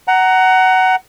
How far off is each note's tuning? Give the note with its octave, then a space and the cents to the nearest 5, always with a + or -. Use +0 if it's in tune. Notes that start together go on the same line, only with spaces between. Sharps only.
F#5 +20 A#5 +0